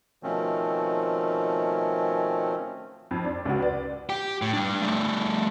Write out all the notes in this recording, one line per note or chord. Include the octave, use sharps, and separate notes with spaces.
B2 D#3 F3 A3 C4 C#4
F2
D4
C#2 F#4
B4 D5
G4 G5
A2
G3 D4
G3 A3